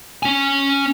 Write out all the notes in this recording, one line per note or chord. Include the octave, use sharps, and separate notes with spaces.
C#4 G#5